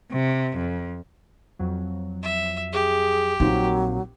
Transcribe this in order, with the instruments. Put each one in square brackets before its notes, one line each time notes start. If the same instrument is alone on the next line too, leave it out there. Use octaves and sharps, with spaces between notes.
[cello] C3
F2
[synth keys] F2 F#3
[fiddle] E5
[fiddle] G4 [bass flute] G#4
[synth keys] A#1 A#2 C4 [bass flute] F#3 [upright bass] D#4